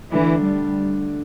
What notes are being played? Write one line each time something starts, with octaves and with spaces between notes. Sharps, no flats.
D3 E3 A3 D4
G3